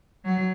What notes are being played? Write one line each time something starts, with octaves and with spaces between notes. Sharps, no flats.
F#3